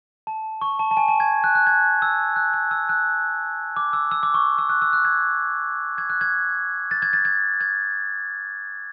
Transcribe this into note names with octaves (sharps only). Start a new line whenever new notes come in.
A5
C#6
A5
A5
G#5
A5
G#6
F#6
F#6
G#6
E6
F#6
F#6
E6
F#6
D6
E6
E6
D6
C#6
E6
F#6
E6
F#6
G#6
G#6
F#6
G#6
A6
G#6
A6
G#6
G#6